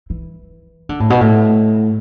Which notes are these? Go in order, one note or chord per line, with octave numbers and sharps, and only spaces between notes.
E3
D3
A2
B2
A2